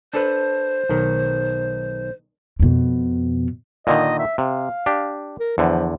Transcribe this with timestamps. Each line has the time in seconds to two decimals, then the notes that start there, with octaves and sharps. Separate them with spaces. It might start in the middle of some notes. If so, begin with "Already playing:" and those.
0.14 D4 A4 B4 C5
0.89 B1 D#3
2.60 F2 B2
3.87 A#2 D3 D#3 D#5
4.19 E5
4.38 C3 F5
4.86 D4 G4
5.40 A#4
5.58 E2 D3 F3